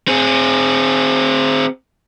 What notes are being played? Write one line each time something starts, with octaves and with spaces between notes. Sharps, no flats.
C4 G#4